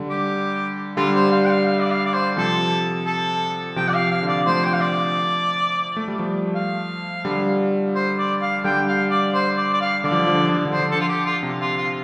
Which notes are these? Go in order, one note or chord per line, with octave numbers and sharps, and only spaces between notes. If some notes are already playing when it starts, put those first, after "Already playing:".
Already playing: D3 G3
G4
D3 G3 F4
C5
F5
G5
F5
F5
D5
F5
D5
C5
C3 F3 A4
A4
C3 F3 G5
D5
F5
F5
D3
D5
F3 A3 C5
G5
F5
D5
A3
G3
F3 A3
F5
D3 G3
C5
D5
F5
D3 G3 G5
F5
D5
C5
D5
D5
F5
D3 D5
F3
D3
F3
D3
F3
D3
F3
D3
F3 C5
D3
A4
F4
G4
F4
C3
F4
F4